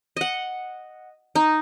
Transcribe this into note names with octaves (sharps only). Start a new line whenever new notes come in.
D#5 F#5
D#4